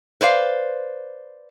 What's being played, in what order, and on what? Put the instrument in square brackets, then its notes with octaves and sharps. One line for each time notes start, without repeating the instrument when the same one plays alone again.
[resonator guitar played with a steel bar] B4 C5 D5 F5